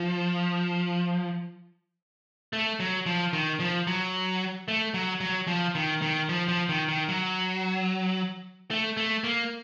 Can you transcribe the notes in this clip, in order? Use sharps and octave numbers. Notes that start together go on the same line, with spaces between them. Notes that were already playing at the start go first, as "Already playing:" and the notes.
Already playing: F3
A3
F#3
F3
D#3
F3
F#3
A3
F#3
F#3
F3
D#3
D#3
F3
F3
D#3
D#3
F#3
A3
A3
A#3